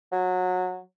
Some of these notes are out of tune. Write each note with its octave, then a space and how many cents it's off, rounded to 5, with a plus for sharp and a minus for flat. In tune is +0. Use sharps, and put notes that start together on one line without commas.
F#3 -20